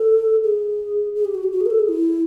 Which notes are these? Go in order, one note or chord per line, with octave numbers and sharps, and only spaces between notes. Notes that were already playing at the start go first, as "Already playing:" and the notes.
Already playing: A4
G#4
G#4
G4
F#4
G4
F#4
G#4
A#4
A4
G#4
E4